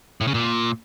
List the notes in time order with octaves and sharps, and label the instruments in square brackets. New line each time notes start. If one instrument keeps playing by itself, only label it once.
[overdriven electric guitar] A2
C#3
A#2